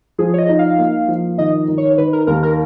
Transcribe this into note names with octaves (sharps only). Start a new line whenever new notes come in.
F3 G#4
C#5
D#5
D#4
F5
A#3
F3
D#3 D#5
D#3
C#5
D#3 B4
A#4
D#2 A#4
A#4